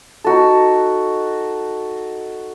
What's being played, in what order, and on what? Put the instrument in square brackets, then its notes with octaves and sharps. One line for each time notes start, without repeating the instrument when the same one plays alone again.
[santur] D#4 F#4 A4